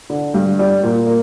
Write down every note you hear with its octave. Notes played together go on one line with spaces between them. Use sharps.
D3
G2
G3
A#2
A#3